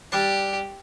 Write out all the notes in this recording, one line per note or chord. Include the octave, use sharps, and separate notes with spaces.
G3 D4 G4 A5